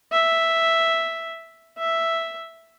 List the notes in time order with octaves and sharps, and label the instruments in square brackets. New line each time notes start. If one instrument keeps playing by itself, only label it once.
[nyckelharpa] E5
E5